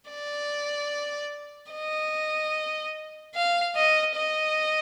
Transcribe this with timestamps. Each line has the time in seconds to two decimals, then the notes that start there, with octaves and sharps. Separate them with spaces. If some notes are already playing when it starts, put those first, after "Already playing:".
0.10 D5
1.72 D#5
3.35 F5
3.75 D#5
4.15 D#5